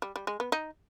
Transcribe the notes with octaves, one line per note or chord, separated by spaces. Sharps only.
G3
G3
G#3
B3
D#4